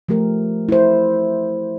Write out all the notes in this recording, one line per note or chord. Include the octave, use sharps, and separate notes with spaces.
F3 A3 G4 A#4
E4 C5